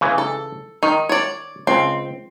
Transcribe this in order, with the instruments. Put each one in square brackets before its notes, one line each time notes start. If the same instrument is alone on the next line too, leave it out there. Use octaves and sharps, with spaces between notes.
[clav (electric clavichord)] C#3 E3
[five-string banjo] A4
[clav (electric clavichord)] D#3 [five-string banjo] D#4
[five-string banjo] C#5 D5
[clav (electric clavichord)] C#2 [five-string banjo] C4